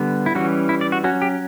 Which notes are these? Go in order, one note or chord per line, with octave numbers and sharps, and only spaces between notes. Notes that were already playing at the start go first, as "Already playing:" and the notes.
Already playing: D3 G3 B3
E4
E3 G3 C#4 F#4
E4
D5
F#4
F#3 C#4 F#4
G4